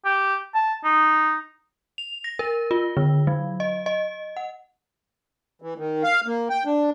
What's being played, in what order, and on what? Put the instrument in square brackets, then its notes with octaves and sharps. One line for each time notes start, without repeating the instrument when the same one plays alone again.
[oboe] G4
A5
D#4
[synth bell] F7
A#6
A#4
F4
D3
F#3
D#5
D#5
F#5
[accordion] E3
D#3
F5
A#3
G5
D4